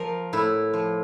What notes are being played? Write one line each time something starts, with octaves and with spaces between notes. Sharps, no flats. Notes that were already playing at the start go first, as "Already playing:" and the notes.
Already playing: F3 A#4
A2 E4
F3